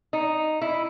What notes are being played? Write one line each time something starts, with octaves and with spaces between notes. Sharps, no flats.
D#4
E4